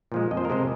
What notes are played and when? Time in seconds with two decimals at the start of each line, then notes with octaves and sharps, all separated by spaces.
0.12 A#2 F3 G#3
0.31 F2 D#5
0.37 C5
0.45 A#4
0.50 C3 G#3 C5